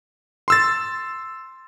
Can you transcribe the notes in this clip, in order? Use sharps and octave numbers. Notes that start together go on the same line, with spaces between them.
C6 E6 A6